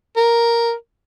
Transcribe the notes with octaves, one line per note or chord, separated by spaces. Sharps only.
A#4